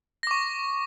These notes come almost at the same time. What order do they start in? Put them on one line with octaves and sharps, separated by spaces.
A#6 D6 C#6